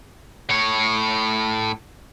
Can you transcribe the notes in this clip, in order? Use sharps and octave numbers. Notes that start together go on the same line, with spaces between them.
A2 C#5